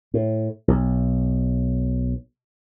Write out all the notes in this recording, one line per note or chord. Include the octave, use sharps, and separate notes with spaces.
A2
B1